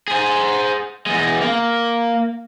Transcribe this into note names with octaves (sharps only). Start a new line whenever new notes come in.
G#4 C5
E2 G#3
A#3